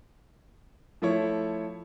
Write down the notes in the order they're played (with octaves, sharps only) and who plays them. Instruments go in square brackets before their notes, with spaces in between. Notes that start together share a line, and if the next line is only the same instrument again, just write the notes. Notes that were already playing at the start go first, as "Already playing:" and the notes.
[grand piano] F3 A3 E4 C#5